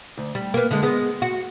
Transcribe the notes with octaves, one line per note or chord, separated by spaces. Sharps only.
D2
G3
A#3 B3
D3 G#3
G#3 B3
F#4